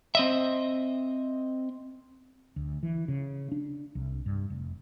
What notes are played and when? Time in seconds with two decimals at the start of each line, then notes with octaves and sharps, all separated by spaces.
0.15 C4 D#5 E5
2.56 D2
2.83 E3
3.08 C#3
3.52 D4
3.95 C2
4.26 G2
4.50 F1